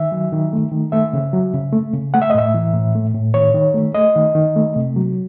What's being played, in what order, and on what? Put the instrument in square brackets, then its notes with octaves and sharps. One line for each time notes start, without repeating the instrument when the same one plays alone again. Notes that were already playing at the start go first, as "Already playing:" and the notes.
Already playing: [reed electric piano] D#3 E5
F#3
D#3
A3
D#3
A3 E5
C#3
F#3
C#3
A3
C#3
A3 F#5
E5
D#5
A2 E5
E3
A2
A3
A2
D#3 C#5
D#3
A3
A3 D#5
D#3
D#3
A3
C3
F#3